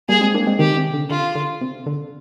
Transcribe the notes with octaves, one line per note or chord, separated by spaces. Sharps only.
G3 A#3 G#4
G#3 C4
A#3 D4
G#3 C4
C3 D#3 G4
C3
D3
D3 F4
D3
C3
D3